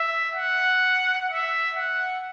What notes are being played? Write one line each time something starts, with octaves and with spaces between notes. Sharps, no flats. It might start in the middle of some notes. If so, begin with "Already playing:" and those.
Already playing: E5
F#5
E5
F#5